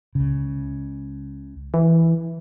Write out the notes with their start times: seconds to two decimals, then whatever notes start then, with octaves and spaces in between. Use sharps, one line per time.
0.15 C#2 C#3
1.74 E3